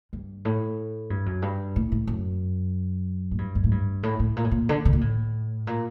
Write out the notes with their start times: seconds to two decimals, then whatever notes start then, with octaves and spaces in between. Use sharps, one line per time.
0.13 G2
0.45 A2
1.10 G2
1.26 F#2
1.42 G2
1.76 A2
1.92 A2
2.07 F#2
3.31 A2
3.38 G2
3.55 F#2
3.64 A2
3.71 G2
4.03 A2
4.20 A2
4.37 A#2
4.44 A2
4.51 A#2
4.69 D3
4.85 D3
4.93 A#2
5.01 A2
5.67 A#2